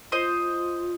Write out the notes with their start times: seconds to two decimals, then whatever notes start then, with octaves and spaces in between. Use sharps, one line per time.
0.12 F4 C5 D#5